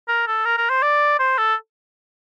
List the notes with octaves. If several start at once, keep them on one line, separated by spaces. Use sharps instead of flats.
A#4
A4
A#4
A#4
C5
D5
C5
A4